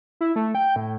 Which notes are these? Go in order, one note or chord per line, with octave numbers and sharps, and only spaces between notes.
E4
A3
G5
A2